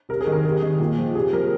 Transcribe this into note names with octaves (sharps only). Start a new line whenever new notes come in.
C3 A#4
G#4
D#3
A#4
C3 G#4
D#3
A#2
F3
C3 G#4
F3 A#4